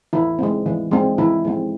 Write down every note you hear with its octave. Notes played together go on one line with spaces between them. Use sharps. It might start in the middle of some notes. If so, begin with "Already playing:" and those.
E3 E4
G#3 C4
E3
G#3 C4
E3 E4
G#3 C4